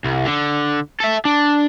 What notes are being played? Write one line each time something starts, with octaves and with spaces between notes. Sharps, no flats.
C2
D3
A4 E5
D4